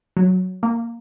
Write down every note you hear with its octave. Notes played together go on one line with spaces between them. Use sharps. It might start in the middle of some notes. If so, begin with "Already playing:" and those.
F#3
A#3